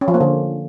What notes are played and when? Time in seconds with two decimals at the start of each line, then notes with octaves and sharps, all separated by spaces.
0.01 C#4
0.08 F3
0.14 A#3
0.21 D3